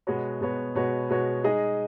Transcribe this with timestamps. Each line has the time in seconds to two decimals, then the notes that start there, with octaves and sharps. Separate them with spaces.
0.07 B2 G#3 B3 F#4 C#5
0.41 B2 G#3 B3 F#4 C#5
0.75 B2 G#3 B3 F#4 C#5
1.09 B2 G#3 B3 F#4 C#5
1.44 G#3 D#4 G#4 D#5